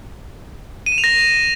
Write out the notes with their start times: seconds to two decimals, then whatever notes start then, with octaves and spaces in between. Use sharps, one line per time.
0.86 D#7
0.92 E7
0.98 F7
1.04 A#6